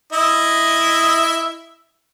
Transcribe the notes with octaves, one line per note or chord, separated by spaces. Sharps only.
E4 D#5 E5